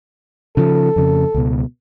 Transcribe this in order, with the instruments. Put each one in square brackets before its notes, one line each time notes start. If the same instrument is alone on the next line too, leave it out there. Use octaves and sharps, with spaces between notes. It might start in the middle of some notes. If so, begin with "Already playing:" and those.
[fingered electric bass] C#3 F3 [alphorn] A4
[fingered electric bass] F2 C#3
C#2 B2